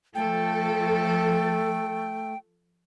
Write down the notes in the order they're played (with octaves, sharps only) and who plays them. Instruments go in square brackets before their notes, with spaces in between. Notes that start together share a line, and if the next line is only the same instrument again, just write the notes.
[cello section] F3 A4 [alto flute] A3 [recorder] G5